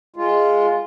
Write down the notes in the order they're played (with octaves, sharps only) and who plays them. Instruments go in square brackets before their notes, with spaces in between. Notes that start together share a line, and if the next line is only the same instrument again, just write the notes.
[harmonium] G#3 F4